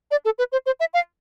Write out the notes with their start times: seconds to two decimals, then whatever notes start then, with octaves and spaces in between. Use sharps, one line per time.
0.11 D5
0.25 A4
0.39 B4
0.52 C5
0.66 C5
0.80 E5
0.94 F5